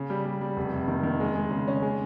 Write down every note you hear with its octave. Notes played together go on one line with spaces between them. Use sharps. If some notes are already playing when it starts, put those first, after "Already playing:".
Already playing: C#3
G3
G3
G3
F1
F1
D#3
D#3
G#3
G#3
C#3
C#4
G#3